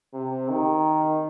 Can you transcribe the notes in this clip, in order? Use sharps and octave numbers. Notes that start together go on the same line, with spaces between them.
C3
D#3